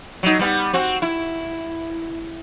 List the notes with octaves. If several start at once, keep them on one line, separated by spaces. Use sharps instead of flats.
F#3 D#4
G3 B3
C4 F#4
E4